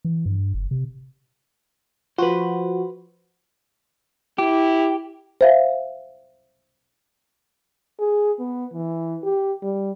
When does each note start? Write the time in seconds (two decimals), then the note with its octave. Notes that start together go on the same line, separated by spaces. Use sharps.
0.05 E3
0.26 G2
0.54 F#1
0.71 C3
2.18 F3 F#4 B4 C5
4.38 E4 G4
5.41 C5 E5 F5
8.00 G#4
8.40 B3
8.73 E3
9.24 G4
9.62 G3